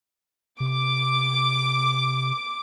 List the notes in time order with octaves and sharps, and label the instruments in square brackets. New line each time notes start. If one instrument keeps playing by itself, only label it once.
[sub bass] C3 [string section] D6